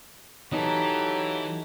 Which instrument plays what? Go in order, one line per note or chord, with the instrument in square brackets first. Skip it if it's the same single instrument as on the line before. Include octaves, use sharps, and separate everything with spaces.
[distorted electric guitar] E3 [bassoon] F#3 [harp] D#4 [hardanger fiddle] G4 A4